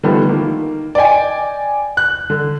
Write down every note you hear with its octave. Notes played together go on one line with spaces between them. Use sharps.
D3 D#3 F3 G3 A3 B3
D#3 A#3
D5 D#5 G5 G#5
F#6
D3